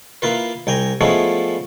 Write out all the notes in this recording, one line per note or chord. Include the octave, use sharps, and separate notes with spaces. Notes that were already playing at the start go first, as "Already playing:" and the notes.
A#3 E4 F4 B4
C2 G5 G#5 A#5
F3 G#3 A3 B3 C#4 E4